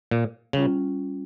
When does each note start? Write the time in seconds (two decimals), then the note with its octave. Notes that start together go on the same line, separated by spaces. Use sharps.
0.11 A#2
0.53 C#3 G3 C#4 F4